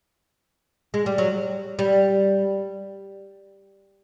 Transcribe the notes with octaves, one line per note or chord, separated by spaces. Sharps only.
G#3
G3
F#3
G3